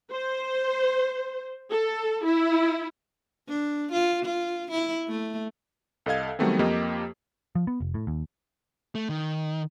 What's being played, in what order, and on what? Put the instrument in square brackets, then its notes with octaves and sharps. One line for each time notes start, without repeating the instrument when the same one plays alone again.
[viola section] C5
A4
E4
[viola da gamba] D4
F4
F4
E4
A3
[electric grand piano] C2 A4 D#5 F5 G#6
D#3 F#3 G3 A3 B3 C4
F2 F3 A#3 G4 D#5
[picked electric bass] F3
B3
F1
A2
D#2
[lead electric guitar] A3
D#3